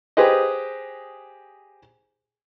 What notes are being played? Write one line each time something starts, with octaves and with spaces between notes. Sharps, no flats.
G4 G#4 B4 C5 D#5